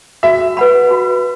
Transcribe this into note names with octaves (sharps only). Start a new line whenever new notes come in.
F#4 E5
B4 F#5 B5
F#4